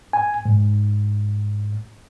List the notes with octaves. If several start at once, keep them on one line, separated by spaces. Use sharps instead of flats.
G#5
G#2